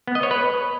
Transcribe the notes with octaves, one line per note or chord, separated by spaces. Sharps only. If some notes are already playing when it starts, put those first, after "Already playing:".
B3
D#5
C#5
B4